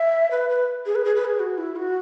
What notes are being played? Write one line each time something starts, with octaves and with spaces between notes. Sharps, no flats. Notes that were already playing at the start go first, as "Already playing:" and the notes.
Already playing: E5
B4
B4
G#4
B4
G#4
B4
G#4
F#4
E4
F#4